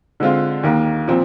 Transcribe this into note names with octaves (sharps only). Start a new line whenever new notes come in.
D3 G#3 C4 F4
D#2 D#3 A#3
A#2 F3 C4